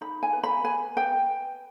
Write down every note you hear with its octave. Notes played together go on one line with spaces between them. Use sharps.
D#4 B5
G#5
B4
B5
B4 G#5
B4 G5